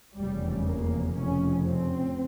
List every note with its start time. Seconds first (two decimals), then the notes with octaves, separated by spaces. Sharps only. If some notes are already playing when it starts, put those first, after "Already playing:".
0.18 F1 E2 C#3 G3
0.68 A#3
1.17 F1 F2 C#3 C#4
1.66 C4